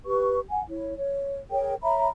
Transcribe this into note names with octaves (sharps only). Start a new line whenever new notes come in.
G4 B4 C#6
F#5 G#5
E4 C#5
C#5
G#4 A#4 C#5 G5
C#5 E5 A#5 B5